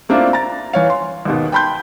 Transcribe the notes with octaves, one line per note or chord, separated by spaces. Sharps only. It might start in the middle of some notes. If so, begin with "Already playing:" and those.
A3 A#3 C4 D4 E4 F4
A#5 A6
E3 C#5 F5
C6
D#2 G#2 B2
G5 A5 B5 C6 G6